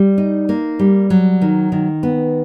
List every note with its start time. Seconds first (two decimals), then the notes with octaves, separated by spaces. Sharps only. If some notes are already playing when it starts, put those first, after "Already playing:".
Already playing: G3
0.18 D#4
0.49 A#3
0.79 G3
1.10 F#3
1.42 D#3
1.72 D#3
2.03 B3